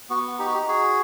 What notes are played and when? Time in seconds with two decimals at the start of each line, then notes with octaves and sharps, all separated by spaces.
0.10 B3 F#4
0.39 D#4 G4
0.46 F#4
0.54 G4
0.68 F#4 G#4